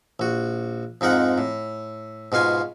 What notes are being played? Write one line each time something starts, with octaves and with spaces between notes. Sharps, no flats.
A#1 F#4
F2 G#2 D#4 A#4 F#5
A2
G#2 B2 F4 F5 G#5